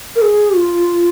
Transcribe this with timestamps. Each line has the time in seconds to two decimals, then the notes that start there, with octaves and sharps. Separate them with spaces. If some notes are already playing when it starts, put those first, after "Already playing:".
0.16 A#4
0.22 G#4
0.56 F4